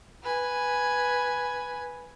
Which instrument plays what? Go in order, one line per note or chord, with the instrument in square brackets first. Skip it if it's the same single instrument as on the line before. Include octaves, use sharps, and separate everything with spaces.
[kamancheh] B4 G#5